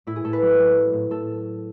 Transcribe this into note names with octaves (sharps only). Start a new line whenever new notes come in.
A2 E4
G#4
A2 A4
B4
F#3
F#3
F#3
A2
A2 A4